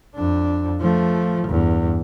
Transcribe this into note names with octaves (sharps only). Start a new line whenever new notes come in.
F2 D4
F3 A3
E2 G2